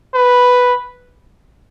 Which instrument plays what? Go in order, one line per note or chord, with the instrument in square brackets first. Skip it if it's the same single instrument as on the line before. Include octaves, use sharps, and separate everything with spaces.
[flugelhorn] B4